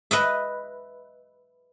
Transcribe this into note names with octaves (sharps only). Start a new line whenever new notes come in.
B4 D#5 E5